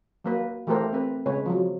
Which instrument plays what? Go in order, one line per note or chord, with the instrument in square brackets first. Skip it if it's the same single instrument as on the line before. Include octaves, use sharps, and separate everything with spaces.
[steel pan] F#3 A#3 B4
E3 A3 G4 A4 A#4 C5
C4 B4
C#3 G#3 B4 C#5
F3 F#3